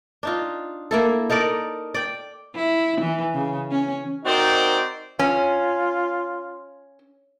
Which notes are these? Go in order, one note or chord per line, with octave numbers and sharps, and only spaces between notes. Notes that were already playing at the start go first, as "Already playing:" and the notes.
D4 D#4 F4
A#3 E4 A4
D#4 A4 A#4 D5
D5 G5
E4
E3
C#3
C#4
C4 D#4 F#4 A#4 C5 D5
C#4 F4